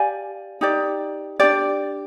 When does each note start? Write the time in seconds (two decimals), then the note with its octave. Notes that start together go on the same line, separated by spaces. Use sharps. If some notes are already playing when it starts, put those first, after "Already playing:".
Already playing: G4 D5 F5 G#5
0.61 D#4 G4 D5
1.40 D4 G4 D5